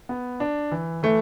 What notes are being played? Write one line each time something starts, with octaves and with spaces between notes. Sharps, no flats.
B3
D4
E3
E3 A3